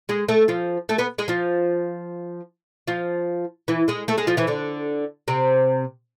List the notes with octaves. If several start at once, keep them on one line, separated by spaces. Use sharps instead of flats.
G#3 G#4
A3 A4
F3 F4
A3 A4
B3 B4
G#3 G#4
F3 F4
F3 F4
E3 E4
G#3 G#4
A3 A4
G#3 G#4
F3 F4
E3 E4
D3 D4
C3 C4